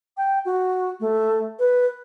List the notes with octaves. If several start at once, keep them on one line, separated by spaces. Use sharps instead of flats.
G5
F#4
A3
B4